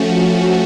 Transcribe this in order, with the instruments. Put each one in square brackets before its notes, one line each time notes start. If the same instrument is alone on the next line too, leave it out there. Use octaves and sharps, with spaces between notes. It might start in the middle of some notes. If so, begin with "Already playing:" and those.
Already playing: [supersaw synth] F3 A3 C#4 F#4